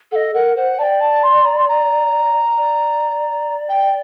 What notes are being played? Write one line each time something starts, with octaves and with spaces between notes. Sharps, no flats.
A4 D#5 F#5
A#4 F#5
C5 F#5
D5 G5 A5
A5
C6
A#5
C6
A#5
D5
G5